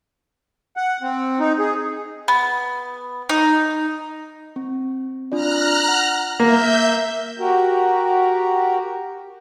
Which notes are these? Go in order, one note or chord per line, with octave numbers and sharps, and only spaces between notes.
F#5
C4
D#4
G#4
B3
D#4
C4
D4 F4 D5 A#5 F6 F#6
F#5
A#3 E5 F6 G6 A#6
F#4 G4 A#4